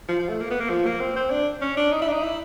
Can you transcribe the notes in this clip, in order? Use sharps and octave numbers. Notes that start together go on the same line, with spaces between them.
F3
F3
A3
A#3
B3
A#3
F3
A#3
C4
C4
D4
C#4
D4
D#4
E4
D4
D#4
E4